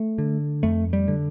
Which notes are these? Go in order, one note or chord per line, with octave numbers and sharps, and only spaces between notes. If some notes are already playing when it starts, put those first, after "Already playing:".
Already playing: A3
D3
F2 A3
G3
D3